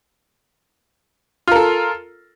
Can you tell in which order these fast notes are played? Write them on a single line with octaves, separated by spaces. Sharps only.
F4 A#4 A4